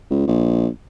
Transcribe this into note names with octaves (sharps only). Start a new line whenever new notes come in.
C#2
A#1